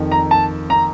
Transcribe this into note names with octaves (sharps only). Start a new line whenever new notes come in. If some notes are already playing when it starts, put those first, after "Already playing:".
Already playing: F2 D#3
A#5
A5
A#5